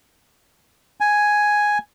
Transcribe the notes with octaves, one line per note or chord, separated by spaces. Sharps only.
G#5